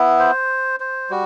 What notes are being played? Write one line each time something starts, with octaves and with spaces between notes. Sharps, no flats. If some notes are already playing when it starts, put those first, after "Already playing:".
Already playing: B3 E4
C5
C5
G3 F#4